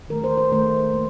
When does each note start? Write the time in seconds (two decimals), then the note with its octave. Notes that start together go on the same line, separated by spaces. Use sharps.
0.09 D#3 A3 A#4
0.24 C5
0.37 C5
0.52 D#3 A3 C5
0.94 A#3